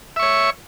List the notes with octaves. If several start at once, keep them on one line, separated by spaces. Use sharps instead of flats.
C#5 E5 C#6